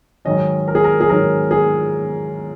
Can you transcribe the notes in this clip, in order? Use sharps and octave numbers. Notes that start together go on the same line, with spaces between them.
G#2 D#3 F#3 C#4 D#5
A#4
G#4
A#4
G#4
G#2 D#3 F#3 C#4 A#4
G#4